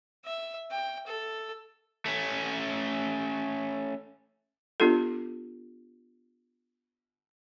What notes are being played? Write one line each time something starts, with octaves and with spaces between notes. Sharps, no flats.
E5
G5
A4
A3 C#4
B3 D4 F4 G4 A4